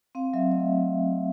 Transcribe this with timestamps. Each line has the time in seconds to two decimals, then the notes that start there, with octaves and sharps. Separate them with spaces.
0.15 C4 F5
0.33 F#3 E5
0.52 A3 D#5